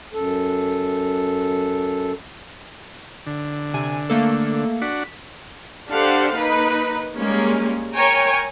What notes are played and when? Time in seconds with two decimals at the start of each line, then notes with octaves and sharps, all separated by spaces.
0.13 F#2 A4
3.27 D3
3.74 C3 G#5
4.10 A3 A#3 A4
4.82 D4 F#4 B6
5.90 D4 G4 A4 C5 F5 F#5
6.35 A#3 D#4 B4 B5
7.16 G3 G#3 A#3 C#4
7.94 A#4 C#5 G5 G#5 A#5